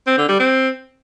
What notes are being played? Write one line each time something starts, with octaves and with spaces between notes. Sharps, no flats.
C4
D3
G3
C4